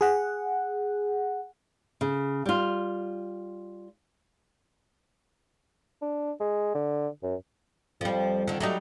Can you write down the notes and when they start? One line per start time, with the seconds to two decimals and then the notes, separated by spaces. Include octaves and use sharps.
0.01 G#4 F#5
2.01 C#3
2.46 G3 F4
6.02 D4
6.40 G#3
6.74 D3
7.23 F#2
8.01 F2 F3 G3
8.48 D3 D#3
8.60 F#3 G3 A3 D#4